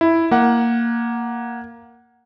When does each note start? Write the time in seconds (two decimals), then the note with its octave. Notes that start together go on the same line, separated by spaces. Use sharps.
0.01 E4
0.31 A#3 F#5